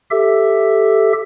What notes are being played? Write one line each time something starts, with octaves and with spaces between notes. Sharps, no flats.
G4 A4 E5